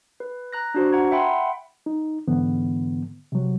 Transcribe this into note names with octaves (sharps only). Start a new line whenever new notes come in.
B4
A#5 F#6 A#6
D4 F#4 C5
F#5 A#5 G#6
E5 F#5 G5 B5 C6
D#4
G#2 D3 E3 B3
C3 F#3